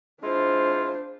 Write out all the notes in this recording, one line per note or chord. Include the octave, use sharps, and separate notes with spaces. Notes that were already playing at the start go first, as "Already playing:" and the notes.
G#3 D4 E4 F4 C5